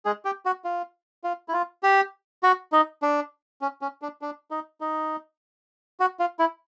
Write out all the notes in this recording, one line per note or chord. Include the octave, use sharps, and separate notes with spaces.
G#3 G#4
G4
F#4
F4
F4
E4
F4
G4
F#4
D#4
D4
C#4
C#4
D4
D4
D#4
D#4
F#4
F4
E4